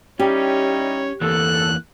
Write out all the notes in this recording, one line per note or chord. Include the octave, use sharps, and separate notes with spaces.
G3 C#4 D#4 E4 G4 C#5
E2 E3 A#3 A4 F#6